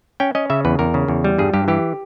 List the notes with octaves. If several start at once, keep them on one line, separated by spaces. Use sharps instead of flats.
C#4 G5
C#4 D#5
C#3 E5
E2 B4
E2 A#4
C#3
E2
G3
G2 G#4
G2 G4
E3 G4